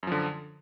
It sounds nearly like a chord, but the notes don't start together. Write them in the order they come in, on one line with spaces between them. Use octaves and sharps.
F#2 F3 D3